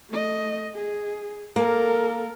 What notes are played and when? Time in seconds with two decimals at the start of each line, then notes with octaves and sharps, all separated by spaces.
0.10 A3 D#5
0.75 G#4
1.56 A#3 A4 A#4